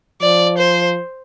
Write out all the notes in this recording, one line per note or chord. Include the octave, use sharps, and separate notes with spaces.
F3 D5
C5